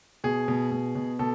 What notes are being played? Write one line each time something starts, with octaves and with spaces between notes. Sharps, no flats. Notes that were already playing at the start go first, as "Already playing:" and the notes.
B2 G#4
B2
B2
B2
B2 A4